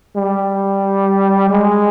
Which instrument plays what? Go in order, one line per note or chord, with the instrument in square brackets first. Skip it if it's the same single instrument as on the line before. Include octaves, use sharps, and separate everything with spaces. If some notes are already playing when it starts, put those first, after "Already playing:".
[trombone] G3
G#3